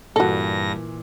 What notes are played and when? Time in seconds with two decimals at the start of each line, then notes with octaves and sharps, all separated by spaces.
0.16 G2 A#2 E3 F#4 A4 A#6